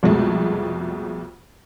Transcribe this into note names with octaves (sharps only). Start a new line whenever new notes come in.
C2 F2 B2 G#3 A3